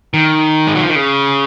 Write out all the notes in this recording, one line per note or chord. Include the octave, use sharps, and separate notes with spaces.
D#3
G#3
F#3
F3
D#3
C#3